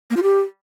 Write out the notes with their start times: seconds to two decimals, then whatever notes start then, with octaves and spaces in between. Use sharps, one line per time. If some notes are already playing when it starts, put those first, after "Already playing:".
0.10 A#3
0.17 F4
0.23 G4